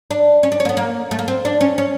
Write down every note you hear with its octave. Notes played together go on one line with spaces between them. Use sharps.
D4
C#4
D4
C#4
A#3
B3
A#3
A3
A#3
C4
D4
C#4
C#4